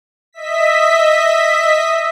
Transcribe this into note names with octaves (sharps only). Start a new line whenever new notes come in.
D#5 E5 B6